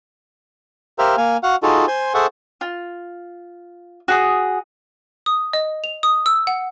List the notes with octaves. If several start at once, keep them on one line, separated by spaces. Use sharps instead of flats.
G4 A#4 C5 E5 F5
A#3 F5 G#5
F#4 F5 F#5
D#4 F4 F#4 G#4 A4
C5 G#5 C6
G#4 A4 C5 E5 F#5 C#6
F4
F#4 G#4 D#6
D#6
D#5
F7
D#6
E6
F#5